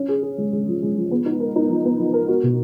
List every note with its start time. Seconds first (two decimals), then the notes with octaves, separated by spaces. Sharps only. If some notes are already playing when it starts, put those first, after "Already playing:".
Already playing: C#4
0.08 G#4
0.23 G#4
0.38 G#3
0.52 G#3
0.67 F3
0.82 G#3
0.96 F3
1.11 B3
1.26 D#4
1.40 A#4
1.56 D#4
1.69 F3
1.85 B3
1.99 F3
2.13 A#4
2.28 F#4
2.43 B2